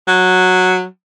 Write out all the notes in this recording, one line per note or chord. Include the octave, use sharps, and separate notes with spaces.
F#3